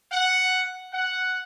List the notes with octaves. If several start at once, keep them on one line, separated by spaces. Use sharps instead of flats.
F#5
F#5